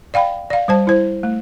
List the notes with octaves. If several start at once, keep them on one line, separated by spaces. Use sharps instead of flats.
D5 F5 G5 B5
D5 F5
G3 C5 A5
E4 C5
A3